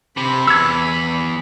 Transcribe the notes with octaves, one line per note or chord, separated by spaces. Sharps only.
C3 B5
E2 E6 G#6